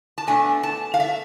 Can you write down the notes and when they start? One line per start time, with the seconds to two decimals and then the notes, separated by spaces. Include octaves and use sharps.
0.18 A5
0.27 B2 A3 D4 G#5
0.63 A5
0.94 F5
1.00 E5